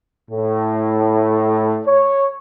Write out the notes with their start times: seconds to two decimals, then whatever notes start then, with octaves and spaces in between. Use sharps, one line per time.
0.30 A2
1.85 C#5